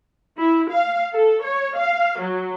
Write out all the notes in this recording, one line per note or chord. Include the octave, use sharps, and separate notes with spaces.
E4
F5
A4
C#5
F5
F#3